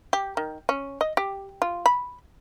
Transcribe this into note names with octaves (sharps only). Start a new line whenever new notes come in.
G4
D#3
C#4
D#5
G4
F4
B5